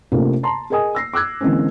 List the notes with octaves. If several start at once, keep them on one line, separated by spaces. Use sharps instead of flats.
C3 A3 A#3 C#4 D4 F4
A5 A#5 C6
G#4 A#4 D#5 G#5 D#6
E6 A#6 C7
D6 E6 F#6 G#6
D3 E3 G#3 A#3 C4 C#4